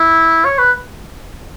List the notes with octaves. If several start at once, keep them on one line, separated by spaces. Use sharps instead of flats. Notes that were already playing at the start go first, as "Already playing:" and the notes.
Already playing: E4
C#5
B4